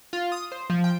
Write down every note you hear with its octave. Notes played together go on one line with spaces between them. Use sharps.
F4
D#6
C5
F3
G5